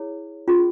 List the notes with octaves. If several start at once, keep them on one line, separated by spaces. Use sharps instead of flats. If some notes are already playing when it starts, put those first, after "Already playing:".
Already playing: E4 G#4 C#5
C#4 F4 G#4